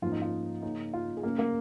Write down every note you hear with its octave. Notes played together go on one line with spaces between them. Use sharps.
G#2 F3 A#3 C#4 F4
D#4
F4
C#3 A#3 C#4 D#4
F4
G#4
C#3 A#3 C#4 A#4
A#3 A#4